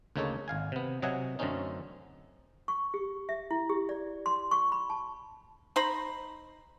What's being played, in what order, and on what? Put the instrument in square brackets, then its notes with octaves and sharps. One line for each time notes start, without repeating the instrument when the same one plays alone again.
[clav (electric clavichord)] D2 C#3 A#3 D#4 A4 C#5
G#1 F5 G#5
C3 B3
C3 F#3 D#5 E5 F#5 G#5
F#2 D3 A3 C4 C#4 D#4
[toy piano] C#6
G4
E5
E4
G4
D5
C6
C#6
B5
A5
[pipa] D#4 C5 A#5 B5